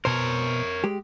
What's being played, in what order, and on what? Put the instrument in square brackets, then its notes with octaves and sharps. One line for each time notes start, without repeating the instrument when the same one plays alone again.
[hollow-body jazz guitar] B2 C5 [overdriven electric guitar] A#4 C#5
[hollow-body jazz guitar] G#3 G4